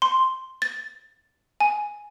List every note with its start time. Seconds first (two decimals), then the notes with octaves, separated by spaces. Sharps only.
0.02 C6
0.62 A6
1.60 G#5